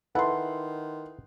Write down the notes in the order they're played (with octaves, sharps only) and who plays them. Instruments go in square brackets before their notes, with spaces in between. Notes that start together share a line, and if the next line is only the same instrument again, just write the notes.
[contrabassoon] D#3 [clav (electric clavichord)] E4 A4 B4 [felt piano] F#5 C6